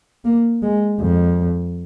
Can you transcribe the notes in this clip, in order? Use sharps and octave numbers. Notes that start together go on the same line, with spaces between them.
A#3
G#3
F2